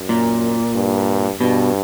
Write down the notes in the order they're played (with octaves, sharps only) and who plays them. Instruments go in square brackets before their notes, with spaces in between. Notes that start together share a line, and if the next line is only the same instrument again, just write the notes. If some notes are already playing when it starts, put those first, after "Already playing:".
Already playing: [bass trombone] F#2
[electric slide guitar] A#2
[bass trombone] G2
[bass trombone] G2 [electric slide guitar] B2